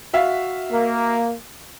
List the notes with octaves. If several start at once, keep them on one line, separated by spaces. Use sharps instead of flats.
F#4 E5 F5
A#3 A#4